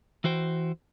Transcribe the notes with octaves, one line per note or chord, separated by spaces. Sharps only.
E3 F#4 C5 G5